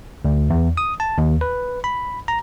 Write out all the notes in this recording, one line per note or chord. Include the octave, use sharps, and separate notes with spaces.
D2
E2
D#6
A5
D#2
B4
B5
A#5